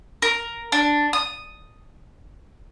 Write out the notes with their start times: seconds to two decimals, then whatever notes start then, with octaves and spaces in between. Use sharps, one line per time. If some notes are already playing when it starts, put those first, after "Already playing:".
0.22 A#4
0.72 D4
1.13 D#6